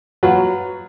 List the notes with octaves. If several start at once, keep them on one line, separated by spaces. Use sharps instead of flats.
F#3 F4 F#4 B4